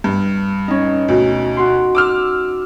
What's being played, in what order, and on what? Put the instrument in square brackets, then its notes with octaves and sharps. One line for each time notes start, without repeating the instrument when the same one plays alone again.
[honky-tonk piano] G2
[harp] C#4 D#4
[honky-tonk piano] D2 B2
[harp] F#4 C6
[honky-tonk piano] D6 E6 F6